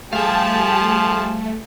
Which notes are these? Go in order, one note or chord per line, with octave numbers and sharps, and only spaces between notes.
F3 G3 A3 G4 G#4 F5 A5